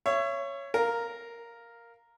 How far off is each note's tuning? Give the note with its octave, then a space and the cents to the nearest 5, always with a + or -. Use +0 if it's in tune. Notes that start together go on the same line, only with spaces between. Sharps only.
C#5 +0 E5 +35
A#4 +0 F5 +0 A#5 -25